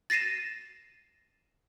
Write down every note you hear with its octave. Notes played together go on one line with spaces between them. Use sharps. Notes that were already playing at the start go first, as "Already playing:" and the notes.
A6 A#6 C7 D#7 E7